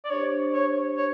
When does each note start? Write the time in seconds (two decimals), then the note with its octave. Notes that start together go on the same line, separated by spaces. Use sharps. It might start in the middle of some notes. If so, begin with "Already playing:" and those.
0.05 D5
0.10 D4 G4 C5 C#5
0.54 C#5
0.97 C#5